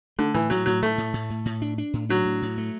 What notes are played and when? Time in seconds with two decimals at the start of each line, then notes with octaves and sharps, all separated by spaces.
0.19 D3 A3
0.34 A2 E3
0.50 A2 F#3
0.66 A2 F#3
0.82 A2 A3
0.98 A2
1.14 A2
1.30 A2
1.45 A2
1.62 D4
1.78 D4
1.93 A2
2.09 F#3 D4
2.25 A2
2.42 A2
2.58 A3